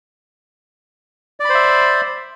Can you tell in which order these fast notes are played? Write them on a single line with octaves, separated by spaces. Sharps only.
D5 B5 C5 E5